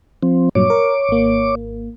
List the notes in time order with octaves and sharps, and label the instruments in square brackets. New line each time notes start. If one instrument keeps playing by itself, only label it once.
[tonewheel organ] F3 C4
[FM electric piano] G2 A#2 F#3 [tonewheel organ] C#5 D6
[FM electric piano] A#4
G#1 A#3